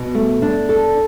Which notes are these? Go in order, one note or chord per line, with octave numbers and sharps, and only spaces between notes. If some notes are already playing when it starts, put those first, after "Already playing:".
Already playing: B2
A3
D4
A4